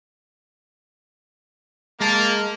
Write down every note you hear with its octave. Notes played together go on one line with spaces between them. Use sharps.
G#3 A#3 A5